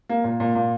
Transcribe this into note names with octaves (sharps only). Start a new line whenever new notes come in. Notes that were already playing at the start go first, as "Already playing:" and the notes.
A#3
A#2
A#2
A#2